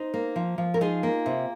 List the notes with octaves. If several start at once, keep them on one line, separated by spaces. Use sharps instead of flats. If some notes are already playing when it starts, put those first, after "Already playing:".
Already playing: D#4 C5
A#3
F3
F3
A#4
D#4 F4 G#4
A#3
C3